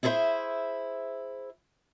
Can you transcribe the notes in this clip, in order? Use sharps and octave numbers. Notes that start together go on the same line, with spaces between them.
E4 G#4 A4 B4 C5 E5